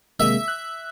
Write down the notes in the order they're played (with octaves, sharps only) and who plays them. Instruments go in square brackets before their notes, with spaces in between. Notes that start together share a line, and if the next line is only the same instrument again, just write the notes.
[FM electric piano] C3 G#3 A#3 [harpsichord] E5
[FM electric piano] F#6